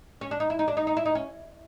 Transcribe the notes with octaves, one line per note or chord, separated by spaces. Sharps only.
C#4
D4
D#4
E4
D#4
D4
D#4
D#4
E4
D#4
C#4